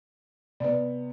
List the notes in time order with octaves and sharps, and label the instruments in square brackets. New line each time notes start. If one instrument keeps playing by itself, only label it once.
[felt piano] C3 B3 [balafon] D5